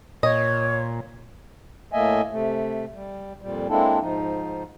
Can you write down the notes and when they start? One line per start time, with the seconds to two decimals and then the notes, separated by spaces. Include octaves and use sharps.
0.23 A#2 C#5 D#5
1.92 A2 A3 A#3 D#5 E5 G#5
2.32 C3 A3
2.94 G3
3.41 F2 A#2 G3
3.69 G#3 A#3 C4 D4 E4 A4
4.01 G#2 F3 D#4